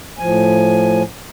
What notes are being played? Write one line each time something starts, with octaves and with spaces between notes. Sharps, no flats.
A2 F3 G#5